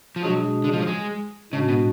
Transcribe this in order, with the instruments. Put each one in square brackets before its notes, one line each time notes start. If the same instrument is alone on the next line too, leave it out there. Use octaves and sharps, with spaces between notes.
[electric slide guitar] F3
[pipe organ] B2 G#3 D4 G#4 [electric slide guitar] F#3
[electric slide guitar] D3
F3
F#3
G#3
[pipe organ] A2 G#3 D4 F#4 [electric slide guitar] C#3
[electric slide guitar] B2